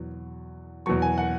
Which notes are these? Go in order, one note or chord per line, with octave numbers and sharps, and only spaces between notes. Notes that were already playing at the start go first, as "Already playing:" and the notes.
Already playing: E2 B2 F#3
E2 B2 F#3 C#6
G#5
F#5